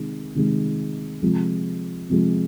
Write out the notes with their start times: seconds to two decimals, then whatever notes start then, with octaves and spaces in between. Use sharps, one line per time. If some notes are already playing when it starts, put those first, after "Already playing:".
Already playing: C3 D#3 G#3
0.35 C3 D#3 G#3
1.22 C3 F3 G#3
2.10 C3 F3 G#3